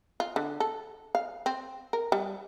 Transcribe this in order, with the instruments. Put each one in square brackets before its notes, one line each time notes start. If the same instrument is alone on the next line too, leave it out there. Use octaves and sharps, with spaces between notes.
[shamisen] F4
D3
A4
F5
C4
A#4
G3